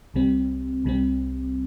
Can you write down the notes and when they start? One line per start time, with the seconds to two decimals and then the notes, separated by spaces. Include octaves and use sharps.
0.14 C2 C3 G3 C4
0.84 C2 C3 G3 C4